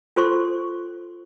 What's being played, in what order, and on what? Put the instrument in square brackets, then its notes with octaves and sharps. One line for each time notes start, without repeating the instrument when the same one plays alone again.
[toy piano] F4 A4 C5 C6 C#6